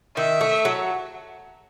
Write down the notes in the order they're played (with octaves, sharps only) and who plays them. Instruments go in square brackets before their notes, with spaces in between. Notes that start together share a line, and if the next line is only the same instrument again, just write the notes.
[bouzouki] D#3 [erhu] E5
[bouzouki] A3
F#3